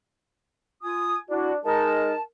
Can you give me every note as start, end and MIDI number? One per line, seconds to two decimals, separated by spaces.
0.83 1.17 65
0.83 1.17 80
0.83 1.17 87
1.30 1.58 62
1.30 1.52 64
1.30 1.52 66
1.65 2.12 56
1.65 2.12 63
1.65 2.21 70
1.65 2.21 81